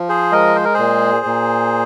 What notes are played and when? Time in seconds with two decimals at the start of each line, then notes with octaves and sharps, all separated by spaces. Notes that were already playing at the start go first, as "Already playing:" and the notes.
Already playing: F3
0.09 G#4 C5
0.32 G#3 A#4 D#5
0.56 C5
0.65 A#4
0.74 A#2 G#4 C5
1.25 A#2